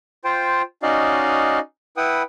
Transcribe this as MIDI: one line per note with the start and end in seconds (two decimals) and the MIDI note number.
0.25 0.62 65
0.25 0.62 72
0.25 0.62 79
0.83 1.59 61
0.83 1.59 63
0.83 1.59 66
0.83 1.59 74
0.83 1.59 75
0.83 1.59 77
1.97 2.22 64
1.97 2.22 71
1.97 2.22 78
1.97 2.22 79
1.97 2.22 87